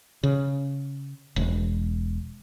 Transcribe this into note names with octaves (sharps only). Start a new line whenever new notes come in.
C#3
E1